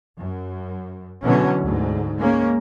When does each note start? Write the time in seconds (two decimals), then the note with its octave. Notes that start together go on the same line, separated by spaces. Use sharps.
0.18 F#2
1.22 B2 D3 E3 F#3 C#4
1.60 D2 G#2
2.18 G#3 A#3 C#4